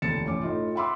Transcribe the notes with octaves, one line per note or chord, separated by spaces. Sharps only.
F1 D#2 A6 C#7 E7
A1 C#4 D6
A2 D#4 F4
E5 F#5 B5 C6 D6 E6